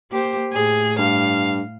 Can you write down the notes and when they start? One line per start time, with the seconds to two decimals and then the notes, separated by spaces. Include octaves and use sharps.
0.11 A#3 G4 C5
0.53 A2 G#4
0.99 G2 F5